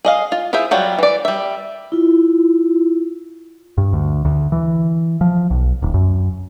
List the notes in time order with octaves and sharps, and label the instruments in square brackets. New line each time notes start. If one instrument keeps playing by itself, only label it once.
[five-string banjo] G#4 D#5 F5
F4
E4 F4 G#4 C5 E5
F#3 G3 F4 F#4
E3 D5
G3 E5
[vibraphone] E4 F4
[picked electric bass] G2
D2
D2
E3
F3
B1
D1
F#2